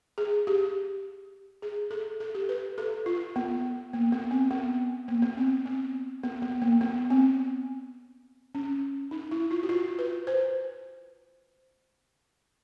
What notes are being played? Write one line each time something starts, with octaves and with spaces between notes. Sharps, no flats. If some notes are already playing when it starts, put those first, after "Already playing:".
G#4
G4
G#4
A4
A4
G4
B4
A4
F4
B3
A#3
B3
C4
B3
A#3
B3
C4
C4
B3
B3
A#3
B3
C4
C#4
D#4
E4
F4
F#4
F4
B4
C5